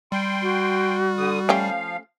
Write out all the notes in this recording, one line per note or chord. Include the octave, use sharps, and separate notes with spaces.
G3 G5 C6
F#4
D3 D#6
F3 A3 C#4 G4 F5